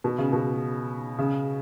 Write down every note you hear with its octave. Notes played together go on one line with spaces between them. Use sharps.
B2
C#3
B2
C#3